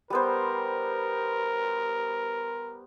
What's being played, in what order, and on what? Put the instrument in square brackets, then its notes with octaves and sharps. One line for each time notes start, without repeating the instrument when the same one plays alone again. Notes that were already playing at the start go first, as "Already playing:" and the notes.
[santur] G3 B3 C5 [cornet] A#4